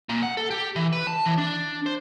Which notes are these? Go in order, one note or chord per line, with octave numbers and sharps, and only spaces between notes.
A#2
F#5
A4
G4
E3
B4
A5
E3
D4
C5